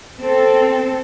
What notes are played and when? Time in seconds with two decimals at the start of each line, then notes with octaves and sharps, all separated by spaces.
0.20 C4 A4